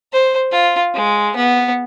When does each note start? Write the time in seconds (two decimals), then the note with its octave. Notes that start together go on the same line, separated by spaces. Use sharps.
0.13 C5
0.51 F4
0.94 G#3
1.36 B3